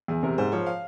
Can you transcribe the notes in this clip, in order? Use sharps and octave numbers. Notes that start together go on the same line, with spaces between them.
E2 G#4
C3 A#4
G#2 C5
F3 C#5
F5